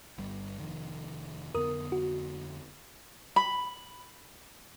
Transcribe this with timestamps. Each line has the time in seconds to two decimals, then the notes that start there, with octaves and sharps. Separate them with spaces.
0.18 G1 G3
0.60 F1 F2 D#3
1.55 F2 D3 B3 A#4 D#6
1.92 F#4
3.36 B5